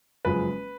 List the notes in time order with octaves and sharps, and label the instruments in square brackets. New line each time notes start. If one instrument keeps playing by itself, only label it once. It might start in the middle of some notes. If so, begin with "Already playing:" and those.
[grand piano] F#1 F#2 F3 G#3 [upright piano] B4